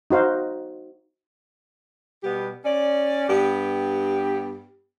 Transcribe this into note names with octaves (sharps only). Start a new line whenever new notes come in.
D#4 F#4 C5 F5
B2 G3 B3 G4
C#4 D5
G2 B3 G4